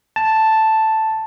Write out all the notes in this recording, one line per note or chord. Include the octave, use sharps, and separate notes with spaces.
A5